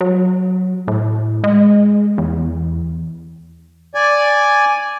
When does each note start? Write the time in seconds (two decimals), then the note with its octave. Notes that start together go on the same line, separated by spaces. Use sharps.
0.01 F#3
0.88 A2
1.44 G#3
2.18 E2
3.95 D5 G#5